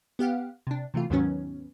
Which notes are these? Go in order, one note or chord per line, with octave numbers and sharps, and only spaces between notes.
B3 G4 F5 F#5
C3 D4
C3 E3 A3 F4
D#2 G#2 D#3 F#3 B3 C#4